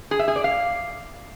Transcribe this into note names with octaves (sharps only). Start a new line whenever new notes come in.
G#4
E5
G#4
D5
F5